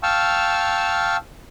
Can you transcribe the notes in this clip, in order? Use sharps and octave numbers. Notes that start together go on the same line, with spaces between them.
F5 G5 A5 C#6 E6 F6